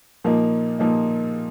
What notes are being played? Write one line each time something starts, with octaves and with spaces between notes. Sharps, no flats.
A#2 F3 A#3 D#4
A#2 F3 A#3 D#4